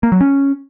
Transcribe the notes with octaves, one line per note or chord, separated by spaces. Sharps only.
A#3
F#3
C#4